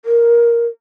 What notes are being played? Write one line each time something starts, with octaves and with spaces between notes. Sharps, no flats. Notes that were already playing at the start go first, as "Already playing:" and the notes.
A#4